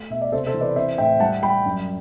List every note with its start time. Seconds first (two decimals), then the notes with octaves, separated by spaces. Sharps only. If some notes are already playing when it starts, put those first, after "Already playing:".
Already playing: A3
0.10 B2 E5
0.22 D5
0.32 C3 A4 C5
0.47 A4 C5
0.54 E3
0.61 B4 D5
0.76 C4 C5 E5
0.98 A2 E5 G5
1.20 G3 F#5 A5
1.43 G3 G5 B5
1.65 F#2